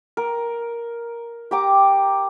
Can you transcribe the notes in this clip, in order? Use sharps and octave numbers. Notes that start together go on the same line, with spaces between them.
A#4
G4 A#5 D6